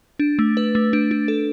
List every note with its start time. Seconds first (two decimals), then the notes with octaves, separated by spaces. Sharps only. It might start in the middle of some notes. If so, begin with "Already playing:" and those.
0.19 D4
0.39 A3
0.57 B4
0.75 A3
0.93 D4
1.11 D4
1.28 A4